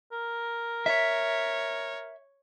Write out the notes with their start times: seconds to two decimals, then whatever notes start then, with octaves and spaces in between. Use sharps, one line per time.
0.12 A#4
0.86 C#5 E5